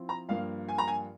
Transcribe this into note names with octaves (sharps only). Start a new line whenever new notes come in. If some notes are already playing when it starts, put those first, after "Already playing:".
Already playing: F3 C4 E4
A#5
G2 F3 A#3 F5
G#5
A#5
G#5